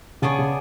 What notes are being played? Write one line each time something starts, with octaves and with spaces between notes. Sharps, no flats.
C#3 B3 D4 G#4 C#5
C#3